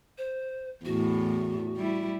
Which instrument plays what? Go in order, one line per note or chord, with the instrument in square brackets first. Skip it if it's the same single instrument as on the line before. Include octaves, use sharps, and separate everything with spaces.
[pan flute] C5
[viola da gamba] E2 A2 [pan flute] F#4
[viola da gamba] G3 E4